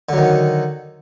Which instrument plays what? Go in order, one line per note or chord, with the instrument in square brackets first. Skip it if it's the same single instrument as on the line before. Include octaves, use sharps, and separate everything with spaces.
[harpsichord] D3
F#3
D#3